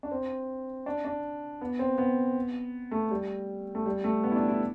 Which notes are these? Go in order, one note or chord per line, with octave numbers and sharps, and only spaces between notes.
D4
C4
D4
D4
B3
C4
B3
A3
G3
A3
G3
A3
B3
E4
D4
E4